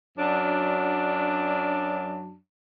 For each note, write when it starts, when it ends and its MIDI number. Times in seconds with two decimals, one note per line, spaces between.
0.18 2.37 42
0.18 2.37 54
0.18 2.37 62